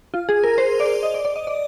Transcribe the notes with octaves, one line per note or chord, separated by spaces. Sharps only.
F4
G#4
A#4
C5
D5
D#5
D5
D5
D#5
D5